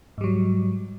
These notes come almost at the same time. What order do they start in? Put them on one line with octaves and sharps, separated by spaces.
G#2 G3 F#3